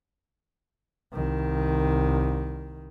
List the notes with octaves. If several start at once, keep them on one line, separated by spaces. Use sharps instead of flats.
C2 D#3